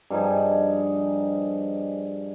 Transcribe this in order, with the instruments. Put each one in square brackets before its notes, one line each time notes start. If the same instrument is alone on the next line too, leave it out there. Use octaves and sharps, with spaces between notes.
[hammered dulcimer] G2 F3 D#4 G#4